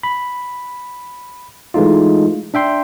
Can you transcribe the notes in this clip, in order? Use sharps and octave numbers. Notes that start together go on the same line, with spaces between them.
B5
E3 G#3 A3 D#4 F4
D4 E5 G5 C6